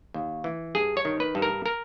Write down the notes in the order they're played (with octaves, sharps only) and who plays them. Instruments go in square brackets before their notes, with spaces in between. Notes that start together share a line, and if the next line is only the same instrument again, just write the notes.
[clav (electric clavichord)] D#2
E3
G2 G#4
C#5
D#3
B4
G2
A#4
A#4